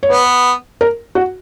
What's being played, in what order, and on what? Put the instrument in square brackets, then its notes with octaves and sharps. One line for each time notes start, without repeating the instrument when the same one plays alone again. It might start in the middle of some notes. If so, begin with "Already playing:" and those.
[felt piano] C#5
[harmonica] B3 [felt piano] B4
[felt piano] A#4
F#4